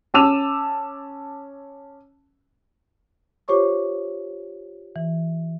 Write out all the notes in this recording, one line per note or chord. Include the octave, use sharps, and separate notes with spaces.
C#4 A5 D6 E6 D#7 F7
F4 G4 C5 C#5 C#6 D6
E3